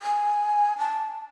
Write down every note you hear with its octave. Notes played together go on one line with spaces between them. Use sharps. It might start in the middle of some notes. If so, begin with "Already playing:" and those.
G#5
A5